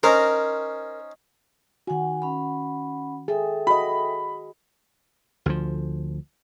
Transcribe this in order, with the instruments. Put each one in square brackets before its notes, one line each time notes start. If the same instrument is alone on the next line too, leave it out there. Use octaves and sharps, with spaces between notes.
[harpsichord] C#4 D#4 C5 [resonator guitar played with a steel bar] A#4
[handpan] D#3 F#4 [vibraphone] F#5 G#5
[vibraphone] C#4 F#5 B5
[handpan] G#4 [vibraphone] A4 E5 G5
[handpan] F#4 D#5 [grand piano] B5
[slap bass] D2 F3